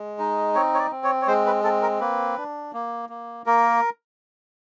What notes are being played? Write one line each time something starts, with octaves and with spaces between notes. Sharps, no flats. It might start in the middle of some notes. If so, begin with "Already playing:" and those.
Already playing: G#3
D#4
C4 C#5
C#5
D5
C4
C#5
C#5
G#3 C5
B4
C4 A4
A#4
A#3 B4
D4
A#3
A#3
A#3 A#4